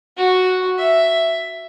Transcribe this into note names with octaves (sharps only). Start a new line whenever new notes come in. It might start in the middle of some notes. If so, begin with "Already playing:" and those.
F#4
E5